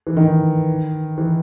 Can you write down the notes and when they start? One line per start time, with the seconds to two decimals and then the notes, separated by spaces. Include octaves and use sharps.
0.07 E3
0.17 D#3
1.18 E3